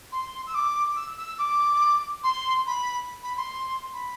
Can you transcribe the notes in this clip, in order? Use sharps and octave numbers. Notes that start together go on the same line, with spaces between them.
C6
E6
D6
E6
E6
D6
C6
B5
B5
C6
B5